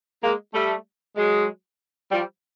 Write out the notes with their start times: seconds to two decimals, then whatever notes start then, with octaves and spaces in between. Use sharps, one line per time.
0.22 G#3 A#3
0.54 G3 A3
1.17 F#3 G#3
2.11 F3 G3